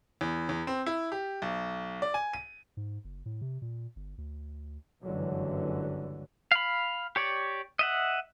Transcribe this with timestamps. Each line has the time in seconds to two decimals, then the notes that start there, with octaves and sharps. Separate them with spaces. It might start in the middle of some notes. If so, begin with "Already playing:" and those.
0.21 E2
0.49 E2
0.67 C4
0.86 E4
1.12 G4
1.42 B1
2.02 D5
2.14 G#5
2.33 D#7
2.77 G#2
3.05 F#1
3.26 A2
3.41 C3
3.62 A#2
3.96 G1
4.18 D2
5.04 F#1 C#2 G2 D3 E3 F#3
6.52 F5 B5
7.16 G4 C#5 D5
7.79 D#5 E5 F#5